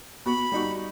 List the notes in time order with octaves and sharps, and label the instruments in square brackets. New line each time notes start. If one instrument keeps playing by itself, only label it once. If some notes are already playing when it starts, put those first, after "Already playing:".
[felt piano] B3 F#4 [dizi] B5
[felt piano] G3 D#4 F#4